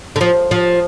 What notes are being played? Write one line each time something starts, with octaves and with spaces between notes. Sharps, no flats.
D3
F3
F3